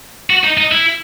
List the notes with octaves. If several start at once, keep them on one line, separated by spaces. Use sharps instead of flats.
F#4
D#4
D#4
E4